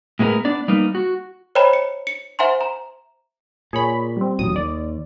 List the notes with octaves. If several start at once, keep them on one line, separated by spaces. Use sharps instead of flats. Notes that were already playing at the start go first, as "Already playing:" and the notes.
A2 G#3 B3 E4 A#4
B3 D4 D5
G3 A#3 B3 D#4
F#4
C5 C#5 D#5 G5 A#5 B5
C#7
C#7
C5 E5 F#5 G#5 A#5 C6
A#5
A#2 G#4 C#5 B5
G3 C4
D#1 A1 F#3 D#6
D#2 D5